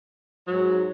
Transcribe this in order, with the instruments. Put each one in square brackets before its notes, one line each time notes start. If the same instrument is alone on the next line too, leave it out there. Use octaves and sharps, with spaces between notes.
[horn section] G#2 F#3